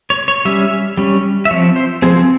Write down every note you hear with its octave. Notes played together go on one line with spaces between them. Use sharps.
C#5
C#5
G3 C#4 E5
G3 C#4
E5
F3 C4 C#5
C5
F3 C4 G#4